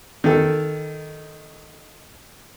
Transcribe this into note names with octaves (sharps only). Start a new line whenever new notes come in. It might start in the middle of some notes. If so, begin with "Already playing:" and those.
D#3 A4